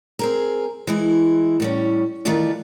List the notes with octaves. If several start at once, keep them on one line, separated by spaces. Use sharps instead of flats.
C4 G#4 A#4
E3 G#3 E4
A2 G3 C#4
D#3 E3 G3 A3 F4 D5